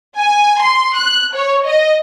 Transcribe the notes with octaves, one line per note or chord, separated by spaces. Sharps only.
G#5
C6
F#6
C#5
D#5